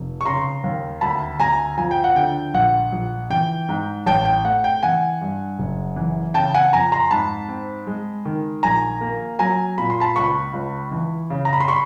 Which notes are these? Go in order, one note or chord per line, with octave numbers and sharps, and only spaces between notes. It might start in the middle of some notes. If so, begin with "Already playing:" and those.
Already playing: F1
C#6
C#3 A#5 C6
D#2
D2 A5 B5
D2 G#5 A#5
F3 G#5
G5
F#5
D3 G5
A#1 F#5
A#1
E3 G5
G#2
A1 G5 A5
G5
A3 F#5
G5
E3 F#5 G#5
G2
F#1
E3
C#3 G5 A5
F#5 G#5
F2 G#5 A#5
A#5 C6
G#2 A5 B5
C4
G#3
D#3
A#1 G#5 A#5
A#3
F#3 G#5 A#5
A#2 B5
C6
A5 B5
C#2 B5 C#6
C#2
E3
C#3
A#5
B5
C6
B5 C#6